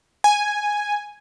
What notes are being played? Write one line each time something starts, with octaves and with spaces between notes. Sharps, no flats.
G#5